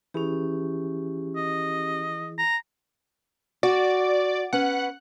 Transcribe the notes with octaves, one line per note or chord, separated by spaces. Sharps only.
E3 C#4 E4 G4 G#4
D#5
A#5
F#4 D5
C#4 B4 F#5